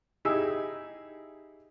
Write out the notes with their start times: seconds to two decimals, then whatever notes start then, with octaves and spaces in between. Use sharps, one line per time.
0.25 D#4 E4 G4 G#4 E6